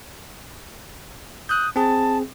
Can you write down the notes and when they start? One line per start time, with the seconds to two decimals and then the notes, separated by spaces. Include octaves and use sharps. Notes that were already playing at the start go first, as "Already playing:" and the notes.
1.49 D#6 F#6 G6
1.76 C4 G#4 A5